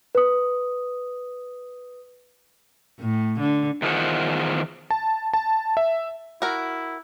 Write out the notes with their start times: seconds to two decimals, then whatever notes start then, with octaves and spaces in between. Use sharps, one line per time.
0.15 B4 D#6
2.99 A2
3.40 D3
3.82 E2 D#3 F4 G#4 C5 F#5
4.90 A5
5.33 A5
5.77 E5
6.42 E4 F#4 A#4